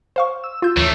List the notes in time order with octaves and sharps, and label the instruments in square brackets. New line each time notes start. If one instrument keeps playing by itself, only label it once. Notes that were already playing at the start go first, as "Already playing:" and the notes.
[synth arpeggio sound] C5 F5 C#6
[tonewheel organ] E6
[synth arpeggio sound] F4 G6
[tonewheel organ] D#2 C#5 [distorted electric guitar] E3 A3